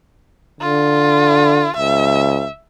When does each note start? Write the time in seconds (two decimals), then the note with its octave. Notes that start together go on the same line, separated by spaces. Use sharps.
0.61 D3 F4
1.76 C#2 E5